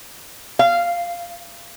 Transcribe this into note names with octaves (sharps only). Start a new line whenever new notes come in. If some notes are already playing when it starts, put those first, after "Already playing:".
F5